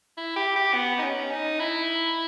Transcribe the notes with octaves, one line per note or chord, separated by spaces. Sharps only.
E4
G4
G4
B3
D#4
C#4
D#4
E4